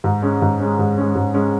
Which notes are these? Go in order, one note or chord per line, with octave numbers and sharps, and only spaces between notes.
G#2
G#3 C#4
G#2
G#3 C#4
G#2
G#3 C#4
G#2
G#3 C#4